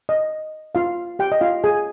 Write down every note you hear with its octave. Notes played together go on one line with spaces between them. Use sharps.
D#5
F4 F5
G4 G5
D#5
F4 F5
G#4 G#5